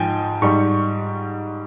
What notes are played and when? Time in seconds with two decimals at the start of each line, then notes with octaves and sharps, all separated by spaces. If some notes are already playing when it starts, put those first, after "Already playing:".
Already playing: G#2 F3 G5 G#5
0.42 G#2 G3 C#6